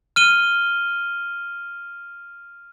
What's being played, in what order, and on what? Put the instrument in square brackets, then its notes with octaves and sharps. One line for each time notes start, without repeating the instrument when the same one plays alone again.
[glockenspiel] F6 D#7 G7